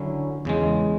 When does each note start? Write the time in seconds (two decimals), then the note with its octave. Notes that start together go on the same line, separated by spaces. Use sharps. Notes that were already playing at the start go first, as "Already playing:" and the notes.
Already playing: D3 F#3 C#4 E4
0.45 E2 C#3 G#3